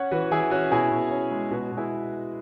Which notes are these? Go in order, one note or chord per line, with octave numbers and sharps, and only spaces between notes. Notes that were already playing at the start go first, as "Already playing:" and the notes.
Already playing: C#4 C#5 F#5
E3 F#4 B4
E3 E4 G#4
C#4 F#4
B2 E4 G#4
B2
C#4
G#3
B2 F#4 B4
B2
E4 G#4